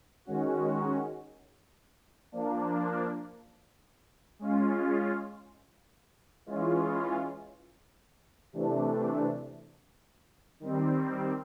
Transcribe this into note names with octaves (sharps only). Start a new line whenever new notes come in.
D#3 G#3 C#4 F#4
F3 A#3 D4
G#3 C#4 F4
E3 G#3 C#4 F4
C3 E3 A3 D4
D#3 G3 C4